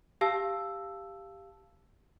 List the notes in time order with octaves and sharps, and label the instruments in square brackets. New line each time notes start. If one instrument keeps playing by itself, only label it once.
[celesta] G4 F5 A5 E6